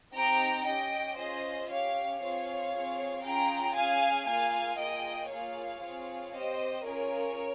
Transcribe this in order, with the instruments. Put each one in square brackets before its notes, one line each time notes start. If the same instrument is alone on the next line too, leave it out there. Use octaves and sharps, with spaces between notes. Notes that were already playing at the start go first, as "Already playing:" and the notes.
[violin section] C4 D#4 G4 G5 A#5
C#4 G4 D#5 G5
C#4 F4 G#4 C5 D#5
C#4 G4 C#5 F5
C4 F4 G#4 C#5 F5
C4 F4 G#4
C#4 F4 G#4 G5 A#5
C#4 G#4 F5 G#5
A#3 F4 G#4 F5 G#5
A#3 F4 G#4 D#5 G5
A#3 F4 G#4 C#5 F5
C4 F4 G#4
C4 G4 C5 D#5
C#4 F4 G#4 A#4 C#5